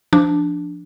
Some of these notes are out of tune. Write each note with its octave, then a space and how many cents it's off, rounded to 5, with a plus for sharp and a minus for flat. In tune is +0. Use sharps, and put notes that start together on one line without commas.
F3 -15 D4 +0